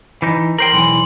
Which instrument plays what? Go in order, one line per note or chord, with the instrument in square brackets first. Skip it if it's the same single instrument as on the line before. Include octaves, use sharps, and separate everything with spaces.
[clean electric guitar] E3 D#4
[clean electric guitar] A#4 C5 G5 [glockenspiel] F#7
[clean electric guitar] B1 E2 E3 [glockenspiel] C6